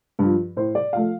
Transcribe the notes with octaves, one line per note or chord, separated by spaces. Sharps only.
G2 F3
A2 C5
D5
F3 A3 F5